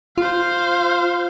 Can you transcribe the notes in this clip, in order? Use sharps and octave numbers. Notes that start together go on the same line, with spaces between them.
F4 C5 F5